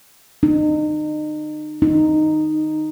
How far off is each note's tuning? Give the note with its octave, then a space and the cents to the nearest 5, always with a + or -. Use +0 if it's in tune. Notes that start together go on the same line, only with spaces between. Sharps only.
D#4 -35
D#4 -10